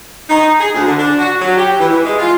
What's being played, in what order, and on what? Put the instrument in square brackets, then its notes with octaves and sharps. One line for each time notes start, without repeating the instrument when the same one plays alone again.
[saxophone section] D#4
G#4
D2
D3
D4
F#4
F#3
G4
E3
E3
G#3
F4